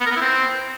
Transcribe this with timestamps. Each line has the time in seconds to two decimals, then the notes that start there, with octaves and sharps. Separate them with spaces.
0.01 B3
0.06 A#4
0.11 B3
0.16 E4
0.21 C4